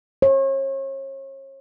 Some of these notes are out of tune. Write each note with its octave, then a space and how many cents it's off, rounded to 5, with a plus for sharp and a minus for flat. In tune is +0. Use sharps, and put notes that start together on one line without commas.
C#5 -40